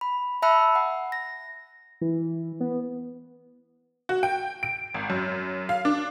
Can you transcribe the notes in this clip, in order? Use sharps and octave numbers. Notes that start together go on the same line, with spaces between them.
B5
E5 A5 B5 E6 F#6 C#7
F#5
A#6
E3
B3
F#4
G5
D7
G#1
F#2
F5
D4